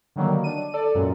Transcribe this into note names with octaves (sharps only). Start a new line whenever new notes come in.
D3 D#3 F#3 G3 A#3
D4 D#7
A4 D5
F#2 A#2 F#3 G#3 C#4